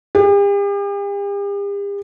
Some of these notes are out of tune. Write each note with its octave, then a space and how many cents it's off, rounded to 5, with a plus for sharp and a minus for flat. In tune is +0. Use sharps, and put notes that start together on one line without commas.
G4 +45